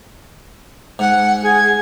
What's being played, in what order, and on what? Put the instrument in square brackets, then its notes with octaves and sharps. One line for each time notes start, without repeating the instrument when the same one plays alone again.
[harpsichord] G#2 [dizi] F#5
[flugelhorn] G#4 [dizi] G#6